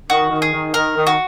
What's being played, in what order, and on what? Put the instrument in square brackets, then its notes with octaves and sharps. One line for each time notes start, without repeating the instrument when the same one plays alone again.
[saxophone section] D#3 [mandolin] F#4
[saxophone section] D#3
[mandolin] G#4
[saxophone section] D#3
[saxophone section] D#3 [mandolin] A#4
[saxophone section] D#3
[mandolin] F#4